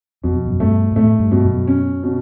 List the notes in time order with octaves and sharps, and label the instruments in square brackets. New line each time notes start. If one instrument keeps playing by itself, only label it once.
[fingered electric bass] F2 [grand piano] B2
[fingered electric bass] F#2
[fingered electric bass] G2 [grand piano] A3
[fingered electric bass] A#2
[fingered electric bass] A2 [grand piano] A3
[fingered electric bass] G2
[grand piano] B2
[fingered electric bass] F#2
[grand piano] C#4
B2